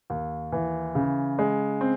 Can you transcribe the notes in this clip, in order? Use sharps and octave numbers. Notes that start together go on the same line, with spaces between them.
D#2
E3
C#3
G#3
C4